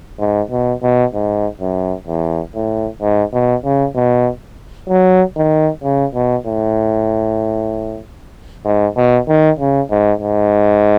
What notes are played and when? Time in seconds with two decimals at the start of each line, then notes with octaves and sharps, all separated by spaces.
0.19 G#2
0.51 B2
0.83 B2
1.14 G#2
1.61 F#2
2.08 E2
2.55 A2
3.02 G#2
3.33 B2
3.65 C#3
3.96 B2
4.89 F#3
5.36 D#3
5.83 C#3
6.14 B2
6.46 A2
8.65 G#2
8.97 B2
9.28 D#3
9.59 C#3
9.90 G#2
10.22 G#2